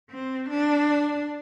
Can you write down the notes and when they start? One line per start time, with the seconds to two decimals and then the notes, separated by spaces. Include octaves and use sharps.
0.10 C4
0.49 D4